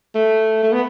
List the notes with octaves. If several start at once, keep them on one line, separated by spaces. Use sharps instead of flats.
A3
A3
B3